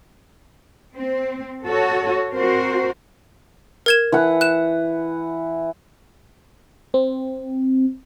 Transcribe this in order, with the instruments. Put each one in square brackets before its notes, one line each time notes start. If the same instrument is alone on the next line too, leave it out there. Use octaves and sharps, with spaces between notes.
[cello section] C4
F#4 A4 C#5
C4 F#4 A#4 C5
[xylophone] A#4 G#6 E7
[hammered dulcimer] E3 F#5
[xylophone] F#6 E7
[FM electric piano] C4